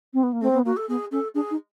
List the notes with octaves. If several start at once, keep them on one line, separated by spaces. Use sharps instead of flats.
C4
B3
A#3
A3 C4
B3
A#3 F#4
A4
B3 G#4
C#4 A4
D4 G#4
D#4